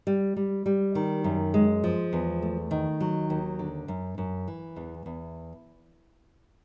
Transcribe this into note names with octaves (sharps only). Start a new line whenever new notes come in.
G3
G3
G3
D#3
F#2
G#3
F3
E2
A3
D#3
F#3
D#2
D3
F#2
F#2
E3
E2
E2